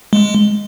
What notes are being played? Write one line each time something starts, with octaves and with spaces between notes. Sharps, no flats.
G#3